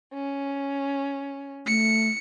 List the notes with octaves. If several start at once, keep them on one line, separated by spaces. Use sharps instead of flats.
C#4
A3 C#7